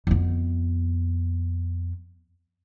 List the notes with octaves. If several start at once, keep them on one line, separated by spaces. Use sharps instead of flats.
F2 B3